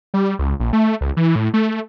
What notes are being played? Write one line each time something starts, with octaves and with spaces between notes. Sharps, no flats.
G3
C#2
A#1
A3
C#2
E3
A2
A3